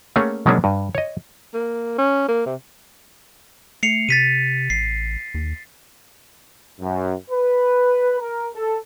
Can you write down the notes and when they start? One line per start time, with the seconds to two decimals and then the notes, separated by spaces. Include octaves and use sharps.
0.16 A3 A#3 C#4 G#4 C#5 F#5
0.46 B2 F#3 G#3 A#3 C#4 D4
0.64 G2
0.95 C#5 D#5
1.54 A#3
1.98 C#4
2.29 A#3
2.46 C3
3.83 A3 C7 C#7 F7
4.09 C3 A6 B6 D#7
4.70 A1 C7
5.34 D#2
6.81 F#2
7.31 B4
8.20 A#4
8.55 A4